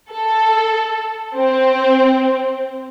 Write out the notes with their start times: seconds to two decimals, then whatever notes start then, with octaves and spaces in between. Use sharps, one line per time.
0.10 A4
1.35 C4